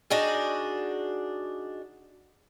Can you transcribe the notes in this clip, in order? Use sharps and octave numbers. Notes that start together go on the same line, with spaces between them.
D4 D#4 F#4 G#4